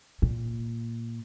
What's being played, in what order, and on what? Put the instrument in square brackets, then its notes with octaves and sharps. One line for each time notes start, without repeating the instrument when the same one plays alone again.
[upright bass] A#2